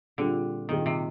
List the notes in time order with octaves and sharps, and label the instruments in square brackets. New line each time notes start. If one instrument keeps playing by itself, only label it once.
[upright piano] A#2 G3 C4 F4 G#4 [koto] D3
[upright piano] A#2 G3 C4 F4 G#4 [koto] D#3
[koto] C3